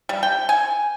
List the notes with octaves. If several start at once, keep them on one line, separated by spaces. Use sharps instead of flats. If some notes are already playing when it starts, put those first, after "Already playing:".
G3
G5
G#5